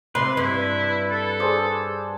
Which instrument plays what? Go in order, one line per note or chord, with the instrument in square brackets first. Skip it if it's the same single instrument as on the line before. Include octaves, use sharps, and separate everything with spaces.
[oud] C3 [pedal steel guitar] B4 [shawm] C6
[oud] G2 [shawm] E4
[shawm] A4
[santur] D4 G#4 C5